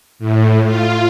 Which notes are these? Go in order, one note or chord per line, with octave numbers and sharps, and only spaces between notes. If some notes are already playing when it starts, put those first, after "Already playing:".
A2
F4